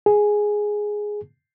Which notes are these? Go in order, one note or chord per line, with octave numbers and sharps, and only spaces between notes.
G#4